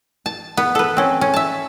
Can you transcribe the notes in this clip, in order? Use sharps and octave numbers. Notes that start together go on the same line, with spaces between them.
A5
B3
A4 B4
C4 C#4
C#4
E5 A5